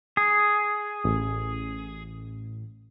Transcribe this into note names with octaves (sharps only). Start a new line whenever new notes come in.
G#4
A1